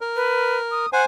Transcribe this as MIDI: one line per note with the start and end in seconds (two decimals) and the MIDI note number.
0.01 0.86 70
0.16 0.58 71
0.71 0.92 87
0.93 1.05 72
0.93 1.01 78
0.93 1.05 80